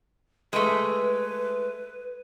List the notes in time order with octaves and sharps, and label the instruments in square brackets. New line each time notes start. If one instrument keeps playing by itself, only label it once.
[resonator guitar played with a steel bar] G#3 A3 [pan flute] B4